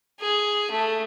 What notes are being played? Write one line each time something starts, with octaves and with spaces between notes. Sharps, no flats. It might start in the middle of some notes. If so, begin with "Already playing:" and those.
G#4
A3